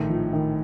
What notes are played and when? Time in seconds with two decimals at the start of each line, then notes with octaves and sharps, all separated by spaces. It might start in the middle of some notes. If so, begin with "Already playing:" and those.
Already playing: A#1 A2 D#3 A3 D#4
0.09 F3
0.33 D#3